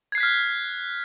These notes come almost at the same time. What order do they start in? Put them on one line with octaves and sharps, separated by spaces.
G#6 C7 F#6 B6 F6